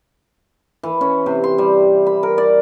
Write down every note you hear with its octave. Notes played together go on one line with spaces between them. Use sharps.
E3
C#4
C3
C6
G3
B5
A#4
D5